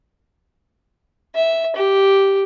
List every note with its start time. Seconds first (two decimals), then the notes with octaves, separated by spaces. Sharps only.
1.35 E5
1.76 G4